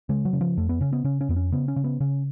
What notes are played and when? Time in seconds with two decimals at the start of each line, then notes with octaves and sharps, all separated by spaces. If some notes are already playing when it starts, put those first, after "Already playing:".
0.09 C#3 G#3
0.25 F#3
0.33 C#3
0.41 F3
0.57 F2 A3
0.69 B3
0.81 C#3 C#4
0.93 B3
1.04 C#3 C#4
1.21 C#4
1.29 F2 B3
1.36 C#4
1.52 C#3 B3
1.68 C#4
1.76 C#3
1.84 B3
2.00 C#3 C#4